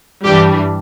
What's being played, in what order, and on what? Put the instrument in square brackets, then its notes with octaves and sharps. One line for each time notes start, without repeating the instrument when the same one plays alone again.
[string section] G2 E3 G3 D4 G4